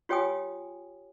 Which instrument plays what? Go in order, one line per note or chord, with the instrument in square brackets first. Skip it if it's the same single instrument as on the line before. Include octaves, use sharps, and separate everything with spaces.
[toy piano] F4 G4 C#5 G5 G#5 D#6